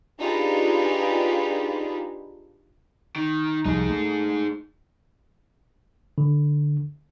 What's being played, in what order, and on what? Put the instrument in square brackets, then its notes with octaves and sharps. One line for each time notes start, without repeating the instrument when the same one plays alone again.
[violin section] D4 D#4 F4 G4 G#4 B4
[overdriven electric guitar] D#3
[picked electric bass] C2 F3 G3 [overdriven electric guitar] D#4 G#4
[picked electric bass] A3
[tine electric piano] D3